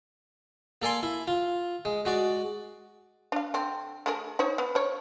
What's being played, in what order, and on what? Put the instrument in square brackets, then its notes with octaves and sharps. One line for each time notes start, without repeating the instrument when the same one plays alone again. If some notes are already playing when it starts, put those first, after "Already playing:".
[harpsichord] A#3 A4 D5 G#5 C6
E4
F4
G#3
G#3 F#4 D5
[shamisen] D4 F5
D3 C4
A3 G#4 A#4
D#4 C5 C#5
B3
C5 C#5